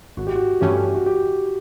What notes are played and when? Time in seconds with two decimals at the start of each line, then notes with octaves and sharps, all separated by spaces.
0.17 G#1 F#4
0.27 G4
0.35 F#4
0.61 G2 E3 A3 C#4 G4
0.95 F#4
1.06 G4